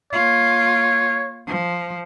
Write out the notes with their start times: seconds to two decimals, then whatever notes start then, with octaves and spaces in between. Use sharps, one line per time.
0.13 A#3 F4 C#5
1.47 F3